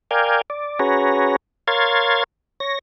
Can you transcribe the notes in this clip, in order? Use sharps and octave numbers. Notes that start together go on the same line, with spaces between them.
A#4 D5 F5 G5 G#5
D5
C#4 F#4 G#4 B4 C#5 A#5
A#4 C#5 F5 C6 G#6 A6
C#5 A#6